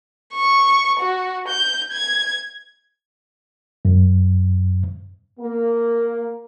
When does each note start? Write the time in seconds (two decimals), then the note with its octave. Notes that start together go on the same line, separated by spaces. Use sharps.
0.34 C#6
1.00 F#4
1.48 G6
1.92 G#6
3.85 F#2
5.40 A#3